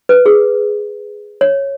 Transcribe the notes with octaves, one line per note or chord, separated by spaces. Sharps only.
B4
G#4
C#5